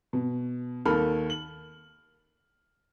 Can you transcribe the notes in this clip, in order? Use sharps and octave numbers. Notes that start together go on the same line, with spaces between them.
B2
D#2 D#3 A4 B5 F6
F#7